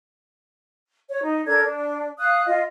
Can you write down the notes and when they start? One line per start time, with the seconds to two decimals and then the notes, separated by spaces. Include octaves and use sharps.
1.10 C#5
1.23 D#4
1.46 D4 A4 A#4 G#6
1.64 D4
2.19 F5 D#6 F#6
2.46 F4 D#5